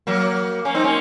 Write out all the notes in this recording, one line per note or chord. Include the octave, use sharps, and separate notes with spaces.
F#3 A#3
A#3 C#4
C4 D#4
A#3 C#4